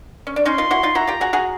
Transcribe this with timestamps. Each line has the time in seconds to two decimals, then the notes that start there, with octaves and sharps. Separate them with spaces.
0.27 C#4
0.36 D4
0.45 C#4 D#4 C6
0.58 D#4 F4
0.71 E4 F#4
0.83 D#4 F4
0.95 E4 F#4 A#5
1.07 F4 G4
1.21 F#4 G#4
1.33 F#4 G#4